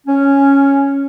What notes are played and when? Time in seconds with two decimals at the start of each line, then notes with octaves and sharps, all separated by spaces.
0.07 C#4